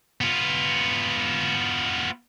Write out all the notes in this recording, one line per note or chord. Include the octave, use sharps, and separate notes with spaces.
B3 F4